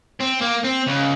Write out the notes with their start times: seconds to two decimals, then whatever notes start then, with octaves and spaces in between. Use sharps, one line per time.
0.21 C4
0.42 A#3
0.65 C4
0.87 C#2